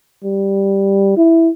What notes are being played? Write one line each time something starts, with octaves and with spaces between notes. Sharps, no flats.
G3
E4